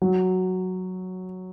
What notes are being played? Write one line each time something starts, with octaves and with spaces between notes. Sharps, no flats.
F#3